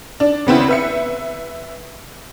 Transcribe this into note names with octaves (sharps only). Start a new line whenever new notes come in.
D4
C#3 B3 C4 E4
B4 E5 C#7